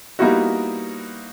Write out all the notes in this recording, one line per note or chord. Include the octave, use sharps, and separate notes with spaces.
G3 A#3 B3 D#4 E4 F#4